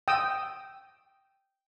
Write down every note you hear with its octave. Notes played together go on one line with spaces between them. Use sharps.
G5 D#6 E6